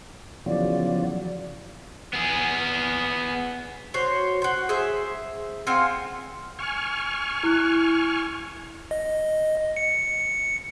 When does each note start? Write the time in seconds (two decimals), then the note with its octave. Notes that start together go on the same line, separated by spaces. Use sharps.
0.46 E2 C#3 F3 F#3 D5
2.13 B3 G#4
3.94 F#4 C5 C#5
4.42 F#4 C5
4.69 G#4 C5 E5
5.67 C4 F4 F#5 G#5
6.59 G#5 C#6 F6
7.43 E4 F#6
8.91 D#5
9.77 C#7